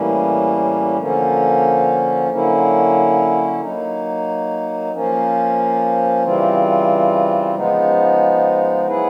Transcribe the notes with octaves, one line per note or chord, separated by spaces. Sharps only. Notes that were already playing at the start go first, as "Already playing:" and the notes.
Already playing: A2 E3 G3 A#3 C#4
D3 F3 A#3 C#4
D3 F#3 A#3 C#4 E4
F#3 A#3 D#4
F3 A#3 C#4
C#3 E3 G3 C4 F4
C#3 F3 G#3 B3 D#4
F#3 B3 E4 G#4 B4